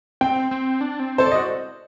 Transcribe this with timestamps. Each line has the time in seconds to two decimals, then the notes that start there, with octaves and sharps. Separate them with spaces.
0.21 C4 G5
0.51 C4
0.81 D4
0.99 C4
1.18 A4 C5
1.26 D5
1.32 D#5
1.35 F#4